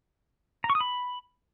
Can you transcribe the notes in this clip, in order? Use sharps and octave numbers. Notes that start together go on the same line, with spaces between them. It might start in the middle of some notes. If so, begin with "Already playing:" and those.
A#5
C#6
D#6
B5